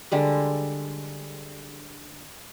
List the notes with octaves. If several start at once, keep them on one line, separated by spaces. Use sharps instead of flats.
D3 G3 G#3